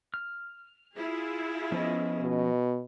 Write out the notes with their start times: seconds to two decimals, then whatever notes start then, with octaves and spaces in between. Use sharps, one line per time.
0.14 F6
0.96 E4 F4 G#4
1.72 F3 B3 C#4 D#5
2.21 B2